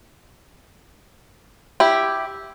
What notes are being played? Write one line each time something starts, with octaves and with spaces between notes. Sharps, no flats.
E4 G4